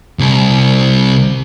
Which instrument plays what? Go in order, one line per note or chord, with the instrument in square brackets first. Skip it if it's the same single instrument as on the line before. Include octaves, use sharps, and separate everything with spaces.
[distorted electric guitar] C2